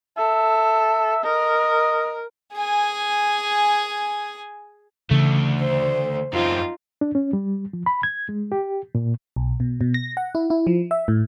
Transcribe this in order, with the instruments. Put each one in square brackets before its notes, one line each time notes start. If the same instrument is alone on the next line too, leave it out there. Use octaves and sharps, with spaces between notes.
[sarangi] A4 [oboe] E5
[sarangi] A#4 [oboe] D#5
[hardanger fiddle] G#4 G#5
[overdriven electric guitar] D2 A3 [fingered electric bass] C#3 E3
[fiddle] C5
[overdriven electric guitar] F#2 C4 [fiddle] D#4 F4
[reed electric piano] D4
C#4
G3
F3
B5
G#6
G#3
G4
A#2
[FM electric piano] B1
B2
B2
A#6
F#5
E4
E4
F3
E5
A2